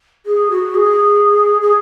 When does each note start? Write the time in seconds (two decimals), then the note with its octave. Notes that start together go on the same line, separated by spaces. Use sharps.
0.26 G#4
0.50 F#4
0.74 G#4
1.61 G#4